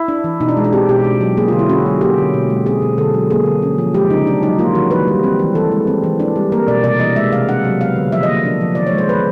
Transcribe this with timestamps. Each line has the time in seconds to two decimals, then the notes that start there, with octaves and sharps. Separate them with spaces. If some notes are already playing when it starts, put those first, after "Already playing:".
Already playing: E4
0.08 D4
0.24 E3
0.40 B2 D#4
0.49 D4
0.57 G#3
0.64 D4
0.73 C4 G4
0.89 B2 G4
1.04 D4
1.21 F#3
1.37 A#3 G#4
1.48 D3 F4
1.59 E4
1.69 C#4 F#4
1.86 F#3
2.01 A#3 G4
2.18 D3
2.34 B2
2.50 G#3
2.66 C4 G#4
2.82 B2
2.98 D3 A4
3.14 F#3
3.30 A#3 G#4
3.46 D3
3.62 C#4
3.78 F3
3.94 G#3 G4
4.10 C#3 D#4
4.27 D4
4.43 F#3 D#4
4.59 A#3 F4
4.75 D#3 F#4
4.91 E3 B4
5.08 G3
5.24 C4
5.39 E3
5.55 E3 A4
5.72 G#3
5.87 C4
6.04 E3
6.20 D4
6.36 G3
6.52 A#3 A#4
6.68 B2 D5
6.84 C3 D5
7.00 E3 D#5
7.16 G#3 E5
7.32 C3 F5
7.48 D4 F#5
7.65 F#3
7.81 B3 F5
7.96 D3
8.12 F3 E5
8.23 D#5
8.29 A#3
8.45 D4
8.61 F3
8.75 D#3 D5
8.86 C#5
8.93 G#3
8.98 C5
9.09 B3 B4